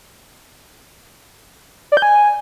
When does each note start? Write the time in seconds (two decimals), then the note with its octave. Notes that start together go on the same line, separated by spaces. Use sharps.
1.92 D5
1.97 G6
2.02 G#5